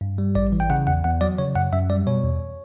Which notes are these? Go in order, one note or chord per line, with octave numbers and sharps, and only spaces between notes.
G2
G3
A1 D5
E3
G5
C#3 F#5
E2 F#5
E2 F#5
F#3 D5
C#3 C#5
F#2 F#5
F#2 E5
G3 D5
B2 C#5
E2